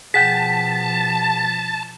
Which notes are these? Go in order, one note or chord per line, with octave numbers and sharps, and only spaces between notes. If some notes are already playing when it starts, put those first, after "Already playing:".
B2 F3 G#4 F#5 G5 A5 B6